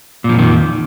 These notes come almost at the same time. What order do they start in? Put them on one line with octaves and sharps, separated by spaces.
A#2 F3 F2 D#3